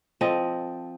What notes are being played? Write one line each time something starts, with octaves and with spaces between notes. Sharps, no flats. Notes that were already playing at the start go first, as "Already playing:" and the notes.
F3 C4 A4 D#5